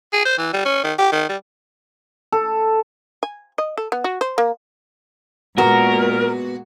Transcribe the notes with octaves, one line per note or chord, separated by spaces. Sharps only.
G#4
C5
E3
G3
C#4
D#3
G4
D#3
G3
A4
G#5
D#5
A4
B3
F#4
C5
A#3
A#2 G#3 B3 F#4 A#4